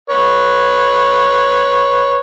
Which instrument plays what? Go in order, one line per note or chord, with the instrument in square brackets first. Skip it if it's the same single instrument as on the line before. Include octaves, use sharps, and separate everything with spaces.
[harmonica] B4 C#5